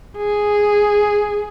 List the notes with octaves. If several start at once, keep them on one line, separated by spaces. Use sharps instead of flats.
G#4